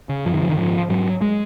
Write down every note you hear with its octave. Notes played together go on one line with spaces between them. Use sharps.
C#3
F#2 F3
D#3
C#3 F3
D#3
G#2 F3
G#2 F#3
G#3